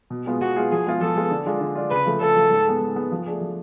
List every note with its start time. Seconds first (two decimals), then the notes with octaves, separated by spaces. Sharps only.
0.10 B2
0.26 G#3 B3 F4 G#4
0.41 B2 F#4
0.56 G#3 B3 F4 G#4
0.71 F3 G#4
0.86 G#3 B3 F4
1.01 F3 A4
1.16 G#3 B3 F4
1.31 D3
1.46 G#3 D4 F4
1.61 D3
1.75 G#3 D4 F4
1.90 C#3 B4
2.06 F3 A3
2.21 C#3 A4
2.35 F3 A3
2.50 G#2
2.66 G#3 B3
2.81 G#2
2.96 G#3 B3
3.12 F3
3.26 A3 D4 G#4
3.41 F3